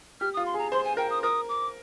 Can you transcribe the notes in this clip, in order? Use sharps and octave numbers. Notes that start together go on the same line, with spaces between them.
G4 F6
F4 D#6
C6
G#4
A#5
C5 C6
G#5
A#4 G5
D#6
A#4 D#6
D6